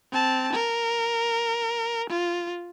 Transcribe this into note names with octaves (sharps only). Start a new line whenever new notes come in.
C4 A5
A#4
F4